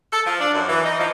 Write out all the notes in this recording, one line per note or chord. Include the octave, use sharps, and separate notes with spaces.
A4
F3
D4
F#2
E3
D#4
F3